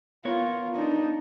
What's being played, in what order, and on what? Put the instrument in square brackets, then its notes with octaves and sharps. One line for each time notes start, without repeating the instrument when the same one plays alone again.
[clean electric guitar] B3 A#4 C#5 [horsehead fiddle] F4
[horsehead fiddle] D4 D#4